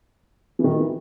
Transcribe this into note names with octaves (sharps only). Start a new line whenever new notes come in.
E3
D#3
E3